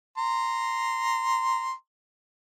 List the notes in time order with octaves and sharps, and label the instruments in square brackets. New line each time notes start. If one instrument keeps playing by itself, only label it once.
[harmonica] A#5 C6